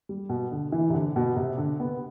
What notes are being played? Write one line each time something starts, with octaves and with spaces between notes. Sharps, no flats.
G3
B2
D3
E3
C3
D3
B2
C3
D3
B3